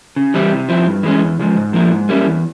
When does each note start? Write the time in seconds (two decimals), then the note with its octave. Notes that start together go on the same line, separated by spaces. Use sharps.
0.16 C#3
0.34 E3 G3 C4 E4
0.52 C3
0.69 F3 C4 E4
0.87 G2
1.03 E3 G#3 C#4
1.21 E2
1.39 C#3 F3 G#3
1.57 G#2
1.73 F3 A#3 E4
1.91 G#2
2.09 G3 A#3 C#4 E4
2.26 E2